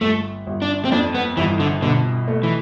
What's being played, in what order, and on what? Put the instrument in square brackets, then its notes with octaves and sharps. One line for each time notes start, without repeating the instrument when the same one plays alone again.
[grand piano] G1 [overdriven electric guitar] A3
[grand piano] G1
[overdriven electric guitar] D4
C4
[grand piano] F2 [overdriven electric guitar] D4
[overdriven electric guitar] B3
[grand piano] G1 [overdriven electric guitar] E3
[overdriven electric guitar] D3
[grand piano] B2 [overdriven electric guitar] D3
[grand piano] A3
[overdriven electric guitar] E3